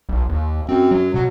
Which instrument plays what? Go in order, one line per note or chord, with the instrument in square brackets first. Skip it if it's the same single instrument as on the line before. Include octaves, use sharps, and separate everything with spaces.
[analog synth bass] B1
D#2
[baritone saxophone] F#2 [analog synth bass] C4
[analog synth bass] F#3
[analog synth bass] B2 [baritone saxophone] F#3